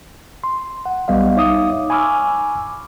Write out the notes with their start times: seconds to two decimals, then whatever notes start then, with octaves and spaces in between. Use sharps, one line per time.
0.44 C6
0.86 F#5
1.08 B1 G3 B3 D#5 F5
1.36 D#4 C#5 E5 F5 D6 D#6
1.90 G#5 B5 C#6 D6 E6 F6